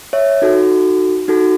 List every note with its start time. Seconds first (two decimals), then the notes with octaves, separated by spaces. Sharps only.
0.13 C#5 E5
0.42 D#4 F#4 A4
1.28 D#4 F#4 A4